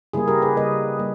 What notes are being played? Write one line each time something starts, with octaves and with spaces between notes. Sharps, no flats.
C#3 G3 A#3 E4 G#4
G4 A#4
G#4 B4
C#3 G3 A#3 B4 D#5
G3 A#3